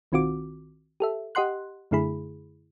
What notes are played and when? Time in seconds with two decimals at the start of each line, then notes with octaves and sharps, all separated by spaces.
0.12 B1 D#3 C4 F4 F#4 D6
1.00 G4 A4 E5
1.35 G4 D#5 F#5 C6 F#6
1.91 F#2 D3 A3 E4 G#4 B5